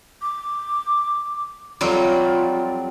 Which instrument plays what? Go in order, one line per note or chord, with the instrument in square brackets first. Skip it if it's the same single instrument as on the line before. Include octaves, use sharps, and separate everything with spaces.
[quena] D6
[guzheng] F2 F#3 G3 [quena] F4